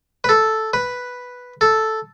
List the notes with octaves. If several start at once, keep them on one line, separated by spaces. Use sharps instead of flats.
B4
A4
B4
A4